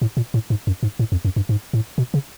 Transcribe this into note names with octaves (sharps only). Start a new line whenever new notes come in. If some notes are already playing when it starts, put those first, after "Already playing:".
A2
A#2
A2
G#2
F#2
G#2
A2
F2
F#2
G2
G#2
A2
B2
C#3